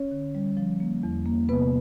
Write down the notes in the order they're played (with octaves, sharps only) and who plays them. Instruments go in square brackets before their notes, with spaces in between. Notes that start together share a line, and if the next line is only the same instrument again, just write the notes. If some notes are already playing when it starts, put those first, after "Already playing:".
Already playing: [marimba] C#4 C#5
D3
G3
F3
A#3
E2
A#3
C3 B3 B4